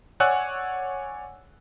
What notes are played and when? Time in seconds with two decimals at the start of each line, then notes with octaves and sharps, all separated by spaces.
0.20 C#5 D5 F#5 G#5 E6 F#6